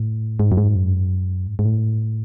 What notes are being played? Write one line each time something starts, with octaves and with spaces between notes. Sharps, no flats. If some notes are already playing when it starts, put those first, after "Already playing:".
Already playing: A2
G#2
F#2
G#2
F#2
G#2
G#2
A2